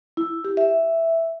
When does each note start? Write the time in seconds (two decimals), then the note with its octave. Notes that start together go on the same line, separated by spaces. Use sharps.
0.17 E4
0.44 G4
0.57 E5